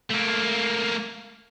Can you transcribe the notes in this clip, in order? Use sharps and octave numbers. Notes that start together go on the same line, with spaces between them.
A3 A#3